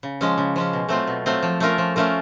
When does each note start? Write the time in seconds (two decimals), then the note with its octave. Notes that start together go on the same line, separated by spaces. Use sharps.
0.03 C#3
0.21 F3 G#3 C#4
0.38 C#3
0.56 F3 G#3 C#4
0.73 B2
0.89 F#3 A3 C4 F4
1.07 B2
1.26 F#3 A3 C4 F4
1.43 F3
1.60 A3 C#4 F4 A#4
1.78 F3
1.96 A3 C#4 F4 A#4